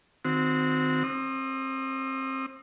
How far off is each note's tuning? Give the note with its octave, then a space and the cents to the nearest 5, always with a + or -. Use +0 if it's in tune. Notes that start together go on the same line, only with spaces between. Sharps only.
D#3 -10 C4 -15 F#4 -25
C4 +30 D#6 -20